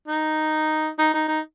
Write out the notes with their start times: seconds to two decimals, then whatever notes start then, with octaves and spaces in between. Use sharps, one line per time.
0.08 D#4
0.99 D#4
1.14 D#4
1.28 D#4